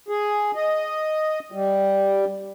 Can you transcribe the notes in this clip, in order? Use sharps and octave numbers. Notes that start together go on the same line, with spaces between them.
G#4
D#5
G3